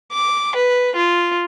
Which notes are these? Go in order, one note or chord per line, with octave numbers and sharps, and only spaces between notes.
D6
B4
F4